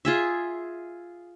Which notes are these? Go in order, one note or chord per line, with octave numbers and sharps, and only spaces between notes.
F4 G#4 E5